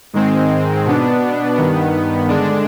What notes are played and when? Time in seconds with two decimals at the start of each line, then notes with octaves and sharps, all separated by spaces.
0.13 G#2 D#3 G#3 C4
0.85 B2 B3 D4
1.56 G2 D#3 B3
2.29 D3 G#3 D4